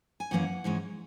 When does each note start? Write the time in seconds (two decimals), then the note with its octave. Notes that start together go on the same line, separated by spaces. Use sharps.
0.20 G#5
0.31 F#2 E3 A#3 C#4 F#5
0.64 G#2 E3 G#3 C#4